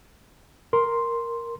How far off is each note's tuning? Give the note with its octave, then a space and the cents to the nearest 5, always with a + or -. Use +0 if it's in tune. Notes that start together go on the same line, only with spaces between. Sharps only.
A#4 +0 C6 +0